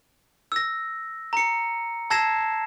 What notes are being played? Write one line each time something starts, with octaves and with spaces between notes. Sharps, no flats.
E6 A#6
A#5 C#7
A5 E6 G#6 A#6 C7 E7